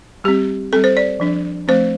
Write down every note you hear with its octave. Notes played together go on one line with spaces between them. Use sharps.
G3 C4 G4
G3 C4 A4
C5
D5
F3 D4
F3 A3 C4 C5